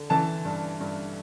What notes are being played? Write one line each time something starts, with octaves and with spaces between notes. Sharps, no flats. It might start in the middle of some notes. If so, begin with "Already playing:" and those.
Already playing: D3
E3 A5
G2
G2